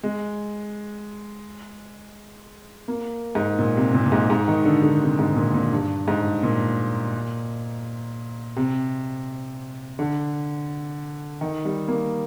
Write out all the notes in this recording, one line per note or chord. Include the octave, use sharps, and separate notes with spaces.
G#3
A#3
G#2
A#2
C3
A#2
A#2
G#2
G#2
D#3
D3
D3
C3
G#2
A#2
A#2
G2
G#2
A#2
C3
D3
D#3
G3
A#3